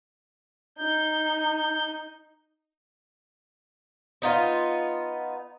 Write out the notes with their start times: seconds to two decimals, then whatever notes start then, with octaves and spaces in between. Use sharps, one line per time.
0.77 D#4 G6
4.22 B3 D#4 F4